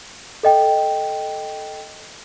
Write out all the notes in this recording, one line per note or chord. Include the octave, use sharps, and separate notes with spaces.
A4 D#5 G5